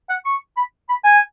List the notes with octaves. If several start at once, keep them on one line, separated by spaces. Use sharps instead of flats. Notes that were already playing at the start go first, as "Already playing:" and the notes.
F#5
C#6
B5
B5
G#5